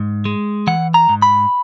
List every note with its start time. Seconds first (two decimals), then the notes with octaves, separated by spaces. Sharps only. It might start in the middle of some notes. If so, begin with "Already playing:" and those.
Already playing: G#2
0.25 G#3
0.67 E3 F#5
0.94 A#5
1.09 G#2
1.22 B5